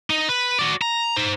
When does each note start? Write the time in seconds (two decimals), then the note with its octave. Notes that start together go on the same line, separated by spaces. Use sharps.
0.10 D#4
0.29 B4
0.59 F#4 D5
0.82 A#5
1.17 D#4 C5